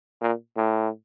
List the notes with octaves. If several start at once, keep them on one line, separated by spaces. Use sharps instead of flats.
A#2
A2